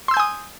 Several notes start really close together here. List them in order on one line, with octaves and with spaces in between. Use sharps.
C6 E6 G6 G#5 D#6